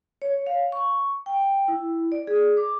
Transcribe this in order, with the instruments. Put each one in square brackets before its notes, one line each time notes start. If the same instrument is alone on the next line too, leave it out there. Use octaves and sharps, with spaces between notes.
[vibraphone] C#5
F5
C#6
G5
E4
D5
G#4
D6